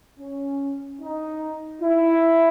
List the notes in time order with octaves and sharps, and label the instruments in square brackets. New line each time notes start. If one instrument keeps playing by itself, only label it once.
[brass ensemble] C#4
D#4
E4